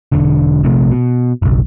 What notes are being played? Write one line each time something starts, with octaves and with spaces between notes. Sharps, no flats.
E1 D3
A#1 C3 A3
B2
F#1 B1